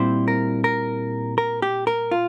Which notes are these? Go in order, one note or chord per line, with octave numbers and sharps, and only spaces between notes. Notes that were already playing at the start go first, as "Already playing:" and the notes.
Already playing: A#2 G3 C4 E4 C5
A#4
A#4
A#4
G4
A#4
F4